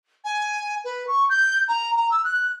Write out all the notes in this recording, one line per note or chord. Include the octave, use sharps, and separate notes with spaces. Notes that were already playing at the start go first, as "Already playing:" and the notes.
G#5
B4
C#6
G6
A#5
A#5
E6
F#6